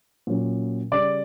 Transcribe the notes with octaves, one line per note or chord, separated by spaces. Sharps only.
A#2 F#3 C#4
C#3 G3 C#4 D5 D6